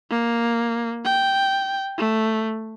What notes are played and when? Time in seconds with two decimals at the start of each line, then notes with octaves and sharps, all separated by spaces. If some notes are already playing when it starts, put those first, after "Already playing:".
0.11 A#3
1.05 G5
1.98 A3